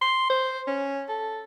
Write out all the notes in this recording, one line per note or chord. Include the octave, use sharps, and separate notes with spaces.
C6
C5
C#4
A4